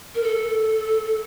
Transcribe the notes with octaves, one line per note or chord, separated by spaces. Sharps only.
A#4
A4